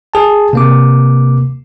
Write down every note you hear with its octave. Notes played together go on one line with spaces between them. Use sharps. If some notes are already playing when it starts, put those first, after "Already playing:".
G#4 A5
C3 A#3 D6